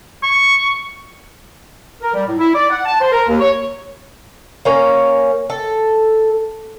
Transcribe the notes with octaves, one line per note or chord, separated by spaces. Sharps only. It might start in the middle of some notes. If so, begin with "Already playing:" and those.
C#6
A#4
G3
A2
E4
D5
F#5
A5
C5
A#4
D#2
C#5
A#3 C#4
A4